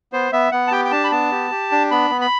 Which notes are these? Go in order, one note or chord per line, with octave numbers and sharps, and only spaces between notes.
B3 C5
B3 E5
B3 F#5
A5
G4 G5
G5
D4 A5
B5
B3 A5
G4
G4
D4
B3 B5
B3
B5